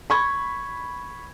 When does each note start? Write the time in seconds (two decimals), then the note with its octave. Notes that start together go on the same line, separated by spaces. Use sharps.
0.10 B5 C#6 G#6